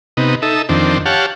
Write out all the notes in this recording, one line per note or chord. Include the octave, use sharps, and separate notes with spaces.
C3 B3 D#4
D#4 A4 E5
F2 D#3 C4 D4
G4 C#5 F5 F#5 A5